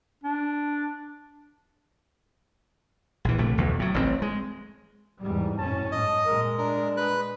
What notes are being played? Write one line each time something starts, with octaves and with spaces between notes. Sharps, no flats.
D4
A#1 E3
A#1 C3 A3
B1 E2 B2
A2 F#3
A1 G2 C4
G#3
E2 G#2 G3
F#1 A2 C#4 A5
G#2 D#5
A#2 G#3 A#4
D4 A#4
B4 F#6